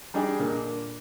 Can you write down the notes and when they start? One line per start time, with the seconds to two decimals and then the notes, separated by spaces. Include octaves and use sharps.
0.14 G3 D4 D#4 G#4
0.39 A#2 D3 A#3